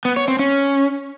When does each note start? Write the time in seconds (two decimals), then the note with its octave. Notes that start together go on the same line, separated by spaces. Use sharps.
0.05 B3
0.16 C#5
0.28 C4
0.39 C#4